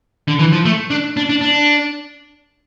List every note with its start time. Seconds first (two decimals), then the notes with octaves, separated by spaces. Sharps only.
0.28 D3
0.39 E3
0.53 F3
0.65 A3
0.90 D4
1.17 D4
1.29 D4
1.41 D4